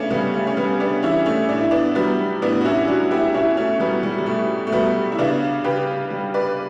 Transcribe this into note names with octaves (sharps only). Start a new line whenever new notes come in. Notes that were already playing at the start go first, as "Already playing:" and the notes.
Already playing: C#3 A3 B3 C#4 D4
C#3 G3 B3
A3
C#4
G3 B3
B3 D4
E3 C#4 E4
A3 C#4
A2 D4
E4
B3 D4
F#3 G3 B3
A2 B3 D4
F#4
C#4 E4
F#3 D4 F#4
E4 G4
B2 C#4 E4
A3 C#4
F#3 G3 B3
G3
G3
B2 A3
A3
F#3 G3 B3
E4
C#3 B3 D4
C#3 G4 B4
G3
B4 D5